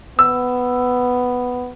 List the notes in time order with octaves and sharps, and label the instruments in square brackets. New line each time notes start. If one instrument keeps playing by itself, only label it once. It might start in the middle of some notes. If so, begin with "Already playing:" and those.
[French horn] B3 [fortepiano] E6